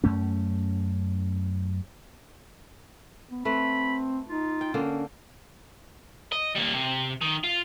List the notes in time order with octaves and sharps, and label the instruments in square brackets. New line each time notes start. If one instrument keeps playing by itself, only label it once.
[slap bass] F#2 A3 C#4
[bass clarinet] B3
[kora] A3 B4 [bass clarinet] C4 [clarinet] B5
[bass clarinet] D#4 [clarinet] F4
[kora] G5
[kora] D3 A#3 [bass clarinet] C#4
[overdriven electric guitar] D#5
G3 A#3
C3
D#3
F4